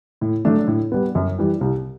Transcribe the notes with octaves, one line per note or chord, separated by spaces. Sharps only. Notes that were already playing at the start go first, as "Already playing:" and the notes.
A2
F#3 A3 D4
A2
G3 B3
F#2
E3 G3
C2